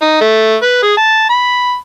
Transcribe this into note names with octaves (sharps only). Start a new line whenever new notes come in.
D#4
A3
B4
G#4
A5
B5